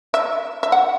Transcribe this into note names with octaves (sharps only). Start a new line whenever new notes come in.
E5
E5
F#5